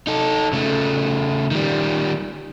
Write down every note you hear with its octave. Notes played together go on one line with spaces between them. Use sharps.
D#4 A4
C#3 A3
D#3 G3